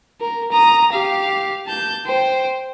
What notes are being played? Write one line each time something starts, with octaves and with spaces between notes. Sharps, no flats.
A#4
A#5 D#6
G4 F5
A5 G6
C5 G5